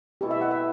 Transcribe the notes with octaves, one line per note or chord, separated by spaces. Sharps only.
B2 A3 E4 G4 A4
E5
F#5
E5